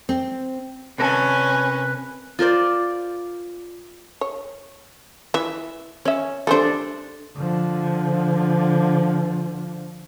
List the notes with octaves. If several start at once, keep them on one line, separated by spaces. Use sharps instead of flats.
C4
C3 C#4 A#4 B4 A5
F4 A#4 C5 D5
C#5
E3 E5
C#4 C#5 E5
G3 A3 D4 A4 C5
D3 F3